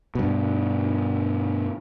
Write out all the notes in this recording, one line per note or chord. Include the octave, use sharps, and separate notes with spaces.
G2 B2